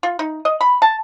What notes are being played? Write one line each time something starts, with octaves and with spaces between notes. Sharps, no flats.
F4
D#4
D#5
B5
A5